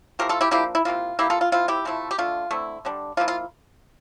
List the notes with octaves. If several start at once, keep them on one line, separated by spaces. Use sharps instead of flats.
F3 A3 E4 G4 A#4
F4 A4
E4 G4
F3 A#3 D4 E4 G4
E4
C3 E3 A#3 E4 F4
E3 G3 A#3 E4 G4
F4 A4
F4
F3 C4 E4 F4
E4 G4
C3 F3 A3 E4
G4
D3 A3 D4 F4
D3 A3 C4 E4
D3 G3 D4
F3 A#3 E4 F4
F4